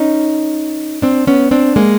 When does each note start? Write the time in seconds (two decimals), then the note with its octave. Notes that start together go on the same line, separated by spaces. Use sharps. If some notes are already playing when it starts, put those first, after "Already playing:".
Already playing: C#4 D#4
1.02 C4 D4
1.27 B3 C#4
1.51 C4 D4
1.76 G#3 A#3